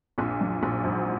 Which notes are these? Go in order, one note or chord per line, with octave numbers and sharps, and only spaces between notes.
A#1 A#2
F#2
A#1 A#2
G#1 G#2